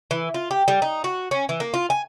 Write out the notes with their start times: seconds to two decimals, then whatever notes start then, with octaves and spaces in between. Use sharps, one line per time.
0.11 E3
0.34 F4
0.51 G4
0.68 G3
0.82 D#4
1.04 F#4
1.31 C#4
1.49 E3
1.60 A#3
1.74 F4
1.90 G#5